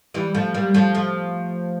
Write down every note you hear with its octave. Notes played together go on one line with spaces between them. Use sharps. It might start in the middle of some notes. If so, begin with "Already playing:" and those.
E3 G3
F3 A3
G3 A#3
F3 A3
F3 A3